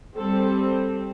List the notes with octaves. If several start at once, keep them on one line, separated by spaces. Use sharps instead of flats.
G3 C4 A4